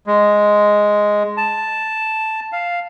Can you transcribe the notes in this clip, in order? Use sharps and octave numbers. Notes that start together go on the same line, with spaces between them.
G#3
A5
F5